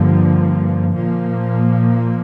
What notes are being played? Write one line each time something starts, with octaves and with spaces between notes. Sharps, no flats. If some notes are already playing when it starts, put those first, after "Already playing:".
Already playing: G2 D3 F3 A#3
A#2 F3 A#3